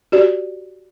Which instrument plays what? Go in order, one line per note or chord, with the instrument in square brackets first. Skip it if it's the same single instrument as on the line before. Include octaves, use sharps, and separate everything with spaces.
[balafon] F#4 G4 D5